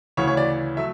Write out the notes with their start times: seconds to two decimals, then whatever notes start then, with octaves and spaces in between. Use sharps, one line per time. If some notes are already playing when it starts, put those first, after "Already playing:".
0.17 D2 C#3 E3 C#5
0.27 C#5
0.37 D5
0.77 F#3 A3 E5